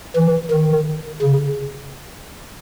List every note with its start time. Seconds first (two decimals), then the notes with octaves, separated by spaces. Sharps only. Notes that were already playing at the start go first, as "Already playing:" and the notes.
0.16 E3
0.51 D#3
1.22 C#3